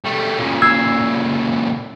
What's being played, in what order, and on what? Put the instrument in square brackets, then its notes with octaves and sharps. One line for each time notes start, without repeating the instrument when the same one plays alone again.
[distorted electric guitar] G3 A3
A#2 C#3
[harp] E6 G#6 C7